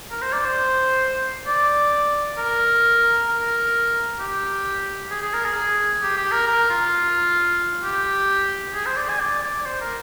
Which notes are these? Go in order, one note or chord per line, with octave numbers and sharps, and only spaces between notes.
A#4
C5
D5
C5
D5
A#4
A#4
G4
G#4
G#4
A#4
G#4
G4
G4
A#4
A#4
F4
G4
G#4
C5
D5
G#5
D5
D5
C5
A#4